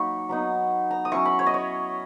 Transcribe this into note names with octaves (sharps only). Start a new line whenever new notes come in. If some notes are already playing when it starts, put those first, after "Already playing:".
Already playing: F#3 A#3 D#4 B5 C#6
F#3 B3 D#4
A#5
D#6
F#3 C#4 E4 C#6
B5
C#5
D#5
C#5